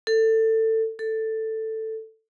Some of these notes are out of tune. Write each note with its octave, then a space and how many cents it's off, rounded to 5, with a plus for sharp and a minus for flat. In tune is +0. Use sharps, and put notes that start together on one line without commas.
A4 +20
A4 +10